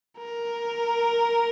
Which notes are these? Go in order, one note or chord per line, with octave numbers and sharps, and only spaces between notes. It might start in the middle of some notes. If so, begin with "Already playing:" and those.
A#4